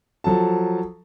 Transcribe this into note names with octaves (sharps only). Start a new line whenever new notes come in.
F3 F#3 A4 A5